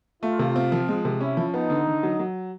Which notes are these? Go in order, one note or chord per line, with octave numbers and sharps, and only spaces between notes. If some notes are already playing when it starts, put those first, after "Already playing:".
A3 F4
C3
C4
F3
G#3
C3
C#4 E4
F3
B3 D#4
D3
D3
F#3
F#3